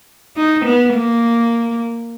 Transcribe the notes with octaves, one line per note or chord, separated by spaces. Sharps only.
D#4
B3
A#3